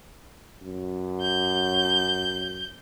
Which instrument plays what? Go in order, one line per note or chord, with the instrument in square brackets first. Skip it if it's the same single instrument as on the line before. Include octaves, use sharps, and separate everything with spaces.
[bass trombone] F#2
[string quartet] G6